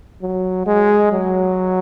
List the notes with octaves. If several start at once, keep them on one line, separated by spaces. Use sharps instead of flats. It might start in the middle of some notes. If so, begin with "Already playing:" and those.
F#3
G#3
F#3